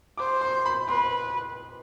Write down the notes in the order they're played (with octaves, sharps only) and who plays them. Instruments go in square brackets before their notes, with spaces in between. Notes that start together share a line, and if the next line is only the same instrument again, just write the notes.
[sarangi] C5 [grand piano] D6
[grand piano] C6
B5
[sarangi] B4 [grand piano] C6